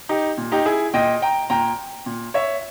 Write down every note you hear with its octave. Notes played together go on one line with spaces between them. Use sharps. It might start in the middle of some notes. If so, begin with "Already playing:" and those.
D#4 G4
A#2
D#4 G4
E4 G#4
A#2 D#5 G5
G5 A#5
A#2 G5 A#5
A#2
C#5 E5